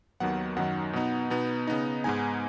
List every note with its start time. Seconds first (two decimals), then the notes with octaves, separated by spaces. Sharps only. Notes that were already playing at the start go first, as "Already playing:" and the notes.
0.20 D#2 D#3 F#3 B3 F#5
0.57 F#2 D#3 F#3 D#4 F#5
0.93 B2 B3 D#4
1.30 B2 B3 D#4
1.67 C#3 B3 D#4
2.04 G#2 G#3 B3 D#4 G#5